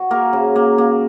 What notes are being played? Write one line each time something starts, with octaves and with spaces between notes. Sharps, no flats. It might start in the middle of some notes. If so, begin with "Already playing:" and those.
Already playing: F#4
A#3 A#4
C#3
A#3
A#3